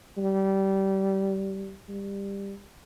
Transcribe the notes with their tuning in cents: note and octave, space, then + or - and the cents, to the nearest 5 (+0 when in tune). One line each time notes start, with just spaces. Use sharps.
G3 -20
G3 +20